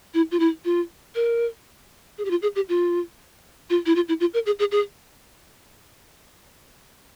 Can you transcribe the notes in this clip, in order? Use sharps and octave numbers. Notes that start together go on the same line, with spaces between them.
E4
F4
E4
F4
A#4
G#4
G4
F4
G#4
G4
F4
F4
E4
F4
E4
F4
A#4
G#4
G#4
G#4